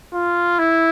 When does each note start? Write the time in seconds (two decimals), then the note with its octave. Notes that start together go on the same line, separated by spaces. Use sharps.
0.14 F4
0.59 E4